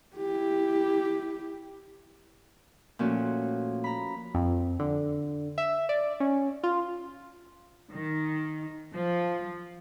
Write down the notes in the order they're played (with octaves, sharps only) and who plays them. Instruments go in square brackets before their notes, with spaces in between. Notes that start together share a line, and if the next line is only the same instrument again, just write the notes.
[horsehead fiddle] E4 G4
[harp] A#2 F3 A3 C#4 F#4
A#5 B5
[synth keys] F2
D3
E5
D5
C#4
F4
[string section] D#3
F3